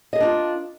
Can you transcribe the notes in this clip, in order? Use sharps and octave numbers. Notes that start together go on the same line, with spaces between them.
D4 F4 G#4 A#4 D#5